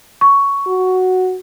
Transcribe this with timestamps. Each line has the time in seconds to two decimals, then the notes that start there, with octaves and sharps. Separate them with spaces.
0.21 C#6
0.67 F#4